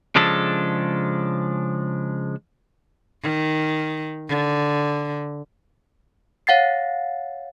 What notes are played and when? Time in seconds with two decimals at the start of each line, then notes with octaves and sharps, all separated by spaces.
0.16 C#3 F3 G#3 D4 A4
3.22 D#3
4.29 D3
6.47 C#5 F5 F#5 A6 C7